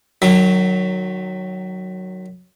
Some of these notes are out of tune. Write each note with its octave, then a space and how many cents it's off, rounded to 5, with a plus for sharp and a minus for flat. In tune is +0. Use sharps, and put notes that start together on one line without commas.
D#3 -30 F#3 +0